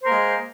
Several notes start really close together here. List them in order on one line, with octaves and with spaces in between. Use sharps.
C5 A#4 A#3 G#3